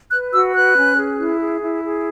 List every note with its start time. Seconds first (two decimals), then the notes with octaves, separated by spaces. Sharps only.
0.11 B4 F#6
0.32 F#4 E6
0.54 B4 F#6
0.76 C#4
0.97 G#4
1.19 E4
1.40 G#4
1.62 E4
1.83 G#4